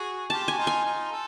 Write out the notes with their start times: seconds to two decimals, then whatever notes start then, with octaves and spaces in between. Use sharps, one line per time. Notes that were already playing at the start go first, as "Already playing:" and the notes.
Already playing: F#4 G#4
0.30 F4 G4 A5
0.48 F#4 G#5
0.58 D#4 F4
0.67 G#5
0.85 D#4 F4
1.12 A4